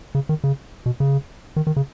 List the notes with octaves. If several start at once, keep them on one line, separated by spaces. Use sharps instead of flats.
C#3
D#3
C#3
B2
C#3
D#3
D#3
C#3